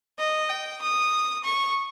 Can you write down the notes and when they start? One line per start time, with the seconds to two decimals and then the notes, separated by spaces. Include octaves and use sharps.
0.19 D#5
0.50 G5
0.81 D#6
1.44 C#6